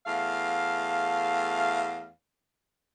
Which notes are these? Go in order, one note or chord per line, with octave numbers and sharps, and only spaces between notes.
E2 A3 F5